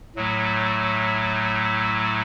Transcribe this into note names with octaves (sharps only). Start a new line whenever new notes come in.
A2 F#3 A3